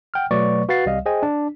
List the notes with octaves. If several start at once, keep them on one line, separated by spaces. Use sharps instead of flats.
F#5 G5 F6
B2 F#3 A3 B4 D5 C#6
F#4 B4 F5 F#5 A6 C7
C2 G3 D#5 F5
G#4 C5 D#5 G5 G#5
D4